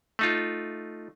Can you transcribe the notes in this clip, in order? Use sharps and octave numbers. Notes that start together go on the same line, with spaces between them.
A3 D#4 F4